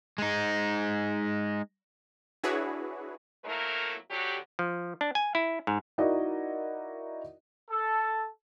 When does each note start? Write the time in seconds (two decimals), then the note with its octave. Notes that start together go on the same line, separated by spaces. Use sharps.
0.18 G#3 D#4
2.43 D4 E4 F#4 G#4 B4 C#5
3.45 F2 F#3 A3 A#3 E4 A#4
4.10 D2 D3 F#3 F#4 G4
4.59 F3
5.01 D4
5.15 G#5
5.35 E4
5.67 G#2
5.98 D#4 E4 F#4 A#4 D5 D#5
7.70 A4